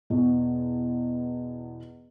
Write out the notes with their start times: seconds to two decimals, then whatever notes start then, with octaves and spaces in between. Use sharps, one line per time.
0.10 E2 B2